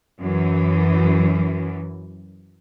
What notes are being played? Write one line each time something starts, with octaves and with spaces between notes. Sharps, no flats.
F#2 E3